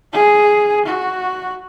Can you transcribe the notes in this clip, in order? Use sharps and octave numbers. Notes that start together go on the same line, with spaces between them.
G#4
F#4